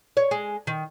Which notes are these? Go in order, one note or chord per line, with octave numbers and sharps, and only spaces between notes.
C#5
G#3
D#3